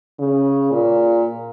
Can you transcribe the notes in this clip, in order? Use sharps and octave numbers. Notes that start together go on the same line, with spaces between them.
C#3
A#2